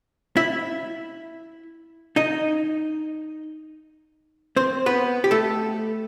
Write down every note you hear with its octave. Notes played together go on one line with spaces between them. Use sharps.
E4 E5
D#4 D#5
C4 C5
B3 B4
G4
A3 A4